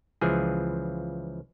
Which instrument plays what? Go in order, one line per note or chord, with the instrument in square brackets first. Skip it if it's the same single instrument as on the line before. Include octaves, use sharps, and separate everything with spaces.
[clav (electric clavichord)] C#2 E3 F3 G#4